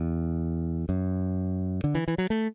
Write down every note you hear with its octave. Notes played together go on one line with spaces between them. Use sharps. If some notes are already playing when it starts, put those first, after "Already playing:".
Already playing: E2
F#2
D3
E3
E3
F#3
A3